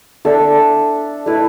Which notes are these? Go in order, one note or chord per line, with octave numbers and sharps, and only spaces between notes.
D4 A4 E5
A3 E4 B4 E5